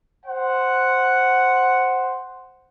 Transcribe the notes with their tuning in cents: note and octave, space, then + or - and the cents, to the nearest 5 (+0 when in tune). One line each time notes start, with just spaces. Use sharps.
C5 +0 F#5 +0